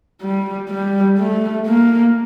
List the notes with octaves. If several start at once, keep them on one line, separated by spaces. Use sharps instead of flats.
G3
G3
A3
A#3